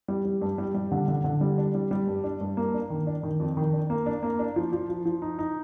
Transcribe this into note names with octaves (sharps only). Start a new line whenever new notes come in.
G3
G3
G2
G3
G3
D3
D3
D3
G3
D4
G3
G3
G2
D4
G2
A#3
D4
D#3
D4
D#3
F2
D#3
D4
A#3
D4
A#3
D4
F3
F3
F3
F3
D#4
D#4